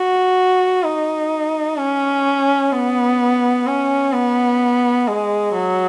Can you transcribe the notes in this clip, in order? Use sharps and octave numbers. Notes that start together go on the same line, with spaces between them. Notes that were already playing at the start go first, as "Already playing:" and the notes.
Already playing: F#4
D#4
C#4
B3
C#4
B3
G#3
F#3